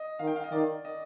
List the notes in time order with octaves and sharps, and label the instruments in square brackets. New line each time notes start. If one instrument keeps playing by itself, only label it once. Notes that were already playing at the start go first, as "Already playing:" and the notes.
Already playing: [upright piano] D#5
[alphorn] D#3 [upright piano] F5
[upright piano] G5
F5
D#5
[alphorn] D#3 [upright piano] D5
[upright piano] D#5